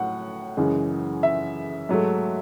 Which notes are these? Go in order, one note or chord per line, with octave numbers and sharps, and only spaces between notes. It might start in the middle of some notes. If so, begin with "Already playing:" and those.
Already playing: A2 F#3 F#5
F#2 C#3 E3 G#3
E5
G#2 F#3 A3